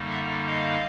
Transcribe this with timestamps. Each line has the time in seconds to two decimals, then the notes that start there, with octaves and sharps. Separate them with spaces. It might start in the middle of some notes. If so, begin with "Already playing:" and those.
Already playing: F#2 D3 G3 A#3 D#4
0.10 E5 F#5
0.46 D#5 F5